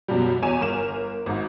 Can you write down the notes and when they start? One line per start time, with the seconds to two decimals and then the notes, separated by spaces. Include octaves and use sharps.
0.08 F#2 B2 G3
0.42 E2 C#5 G#5 D#7 E7
0.61 G1 A#4 E7 F7
1.26 G#1 G#2